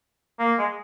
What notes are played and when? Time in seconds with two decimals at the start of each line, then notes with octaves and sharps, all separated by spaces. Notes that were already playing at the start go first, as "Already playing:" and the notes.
0.39 A#3
0.59 G#3